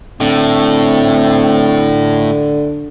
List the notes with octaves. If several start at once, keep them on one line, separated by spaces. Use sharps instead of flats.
A2 D3 C4